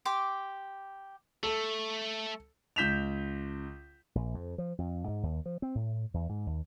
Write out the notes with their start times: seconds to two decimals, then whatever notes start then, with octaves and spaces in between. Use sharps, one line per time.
0.05 G4 C6 D6
1.43 A3 A4
2.76 C#2 G6 B6 E7 F7
4.15 A#1
4.34 F2
4.58 F3
4.78 F2
5.08 G#2
5.23 D#2
5.46 F3
5.62 C4
5.75 A2
6.14 E2
6.29 G#2
6.46 D#2